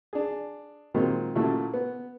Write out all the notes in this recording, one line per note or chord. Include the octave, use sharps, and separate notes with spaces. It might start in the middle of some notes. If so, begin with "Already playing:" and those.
D4 G#4
A#2 D#3 F#3 G#3 C4
A#2 C#3 F#3 A3 E4 F#4
B3